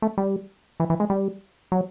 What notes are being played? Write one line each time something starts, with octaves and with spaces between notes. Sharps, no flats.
A3
G3
E3
E3
G#3
G3
F#3